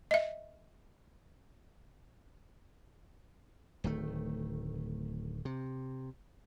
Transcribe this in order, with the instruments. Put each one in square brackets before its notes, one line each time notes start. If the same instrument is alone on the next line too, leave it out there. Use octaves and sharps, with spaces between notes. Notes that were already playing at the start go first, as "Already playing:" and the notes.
[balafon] D#5 E5
[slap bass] D1 D#3 A3
C3